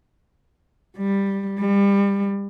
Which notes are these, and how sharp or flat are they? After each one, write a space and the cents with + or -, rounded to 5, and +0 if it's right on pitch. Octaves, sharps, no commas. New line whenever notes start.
G3 +10
G3 +30